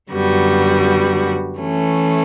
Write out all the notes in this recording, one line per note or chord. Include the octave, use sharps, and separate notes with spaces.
F#2 D3 G3 B3 F#4
E3 A3 C#4